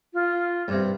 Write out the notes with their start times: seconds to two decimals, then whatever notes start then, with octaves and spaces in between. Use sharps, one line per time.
0.14 F4
0.68 G2 C3